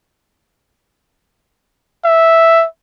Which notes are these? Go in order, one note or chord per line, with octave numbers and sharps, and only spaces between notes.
E5